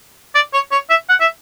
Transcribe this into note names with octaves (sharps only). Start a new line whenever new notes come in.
D5
C#5
C#5
E5
F#5
E5